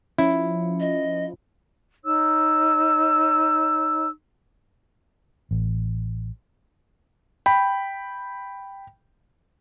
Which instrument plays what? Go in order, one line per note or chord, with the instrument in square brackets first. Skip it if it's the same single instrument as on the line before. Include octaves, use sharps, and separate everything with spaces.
[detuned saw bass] F3 [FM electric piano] C#4 [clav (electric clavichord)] E4
[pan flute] D#5
[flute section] D#4 C#5 E6
[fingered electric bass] A1
[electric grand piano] G5 B5